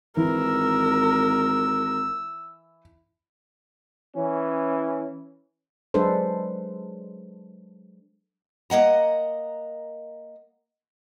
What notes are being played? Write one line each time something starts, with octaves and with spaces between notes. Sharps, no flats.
G#1 E3 A#4 E6
E3 C#4
F#3 G#3 D4 A4 B4 C5
A#3 D#5 F#5 A#5